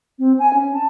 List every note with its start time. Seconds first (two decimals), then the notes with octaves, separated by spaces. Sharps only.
0.19 C4
0.39 G#5
0.54 C#4
0.74 A5